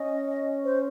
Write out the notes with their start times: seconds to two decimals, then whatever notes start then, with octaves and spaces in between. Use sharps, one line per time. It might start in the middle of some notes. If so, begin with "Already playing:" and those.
Already playing: C#4 D#5
0.64 C5